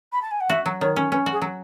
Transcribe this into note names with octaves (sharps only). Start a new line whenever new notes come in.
B5
A5
G#5
F#5
F#4 E5
F#3
D#3 C#5
C#4
C#4 B4
F#4
G#4
F#3